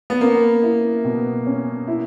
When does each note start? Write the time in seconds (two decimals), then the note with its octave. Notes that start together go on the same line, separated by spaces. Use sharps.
0.10 B3
0.21 A#3 C#4
0.63 E4
1.05 B2
1.46 C#4
1.88 E4